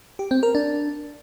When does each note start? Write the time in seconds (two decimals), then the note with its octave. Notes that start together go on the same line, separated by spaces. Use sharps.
0.19 G4
0.31 C4
0.43 A#4
0.55 D4